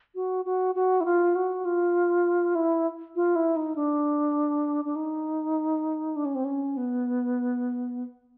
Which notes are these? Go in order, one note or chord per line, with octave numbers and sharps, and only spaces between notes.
F#4
F#4
F#4
E4
F4
F#4
F4
E4
F4
E4
D#4
D4
D4
D#4
D4
C#4
C4
C#4
B3